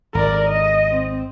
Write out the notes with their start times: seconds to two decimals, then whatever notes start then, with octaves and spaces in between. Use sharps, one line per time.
0.15 G#1 A#4 D5
0.48 D#5
0.91 C4